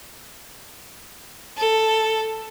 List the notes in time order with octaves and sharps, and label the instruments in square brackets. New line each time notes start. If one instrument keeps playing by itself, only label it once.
[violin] A4